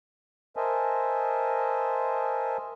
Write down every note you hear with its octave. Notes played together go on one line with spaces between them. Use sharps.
A#4 C5 D#5 E5 G#5 A5